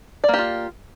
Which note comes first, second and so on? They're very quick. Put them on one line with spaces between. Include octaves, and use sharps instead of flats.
D5 A#3 G4 F4